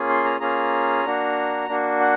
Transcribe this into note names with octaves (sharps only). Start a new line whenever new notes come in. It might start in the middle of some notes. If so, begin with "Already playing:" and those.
Already playing: A#3 C#4 F4 G#4
C6
A#5
A#3 C#4 F4 G#4 A#5
A#3 D4 F#4
A#3 D4 F#4
F#5